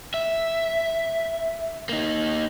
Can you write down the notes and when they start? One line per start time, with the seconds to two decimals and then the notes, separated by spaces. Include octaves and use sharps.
0.14 E5
1.89 A#3 D#4